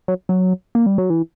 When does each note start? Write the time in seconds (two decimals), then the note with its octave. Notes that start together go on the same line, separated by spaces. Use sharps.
0.08 F#3
0.29 F#3
0.75 A#3
0.86 G3
0.98 F#3
1.10 E3